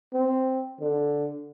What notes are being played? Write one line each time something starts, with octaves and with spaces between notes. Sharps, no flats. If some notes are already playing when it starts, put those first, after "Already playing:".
C4
D3